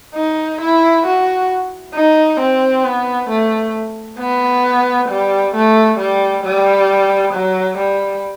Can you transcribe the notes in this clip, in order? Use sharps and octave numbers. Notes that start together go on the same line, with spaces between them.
D#4
E4
F#4
D#4
C4
B3
A3
B3
G3
A3
G3
G3
F#3
G3